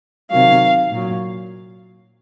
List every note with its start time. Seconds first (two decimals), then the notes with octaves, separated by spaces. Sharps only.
0.30 C3 D#3 F#3 F5
0.91 A#2 F#3